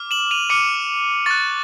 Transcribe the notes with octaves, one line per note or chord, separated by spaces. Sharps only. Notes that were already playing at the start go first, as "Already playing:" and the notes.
Already playing: D6 F6
E7 F#7
D#7 F7
D6 F6 C#7 D#7
C#6 F#6 A6